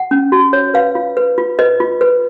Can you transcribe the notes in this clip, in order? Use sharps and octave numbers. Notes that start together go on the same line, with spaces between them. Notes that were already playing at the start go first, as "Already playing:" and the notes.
Already playing: F#5
C#4
F#4
C#5
B4 F5
F4
B4
F4
B4 D#5
F4
B4